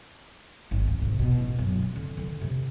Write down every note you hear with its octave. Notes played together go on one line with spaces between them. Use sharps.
G#1
D2
C3
B2
A1
F#2
C4
D3
D3
C3